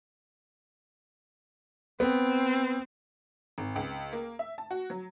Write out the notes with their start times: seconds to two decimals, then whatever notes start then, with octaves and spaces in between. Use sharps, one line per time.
2.00 B3 C4
3.58 G#1
3.76 C#2
4.13 A#3
4.39 E5
4.58 A5
4.71 F#4
4.90 F#3